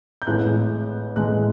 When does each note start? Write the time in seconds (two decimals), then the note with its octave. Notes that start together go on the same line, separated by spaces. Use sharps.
0.22 G6
0.27 A1 A2 E3 G#3 F#6
1.16 A1 A2 E3 G#3 F#6